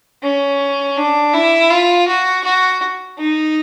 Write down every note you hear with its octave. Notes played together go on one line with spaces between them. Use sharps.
C#4
D4
E4
F4
F#4
F#4
D#4